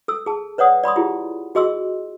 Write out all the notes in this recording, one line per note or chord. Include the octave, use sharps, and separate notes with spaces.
A4 E6
G#4 A5
B4 C#5 D5 F#5 D#6
D5 B5 C6 D#6
E4 F4 G4 G#4
F#4 G#4 D#5 C6 E6